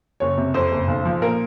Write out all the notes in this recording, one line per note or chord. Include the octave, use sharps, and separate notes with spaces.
F#1 C#5
C3
F2 C5
F#1
B1
F3
A#2 A#4